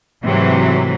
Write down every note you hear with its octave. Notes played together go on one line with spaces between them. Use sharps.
G#2 C3 E3 F#3 A3